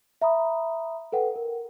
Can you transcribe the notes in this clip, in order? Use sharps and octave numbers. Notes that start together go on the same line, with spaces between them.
E5 A#5 B5 D#6
A4 B4 F#5 G5
A#4